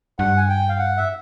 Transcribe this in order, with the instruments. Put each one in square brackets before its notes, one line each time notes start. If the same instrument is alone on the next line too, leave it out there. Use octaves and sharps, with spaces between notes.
[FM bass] G2 [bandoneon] F#5
[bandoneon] G#5
G5
F5
F#5
E5